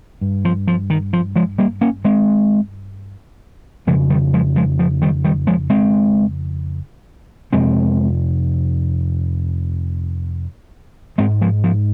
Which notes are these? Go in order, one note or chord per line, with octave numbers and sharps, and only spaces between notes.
G2
F3
F3
D#3
F3
F3 G#3
G3 A#3
A#3 C#4
G#3 C4
F2 C#3 F3 G#3
D#3 G3
F3 G#3
F3 G#3
F3
D#3 G3
D#3 G3
F3 G#3
G#3 C4
F2 C3 G#3 C4
G#2 G#3 C4
F3 G#3
F3